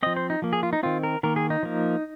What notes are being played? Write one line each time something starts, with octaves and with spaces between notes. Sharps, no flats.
F3 C4 D#5
C5
D#4
F3 A#3
G#4
F4
D#4
D#3 C4 F4
A#4
D#3 A#3 A#4
G#4
D#4
F3 A#3